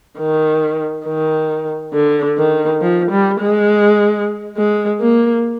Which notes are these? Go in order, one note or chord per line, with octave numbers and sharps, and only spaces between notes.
D#3
D#3
D3
D#3
F3
G3
G#3
G#3
A#3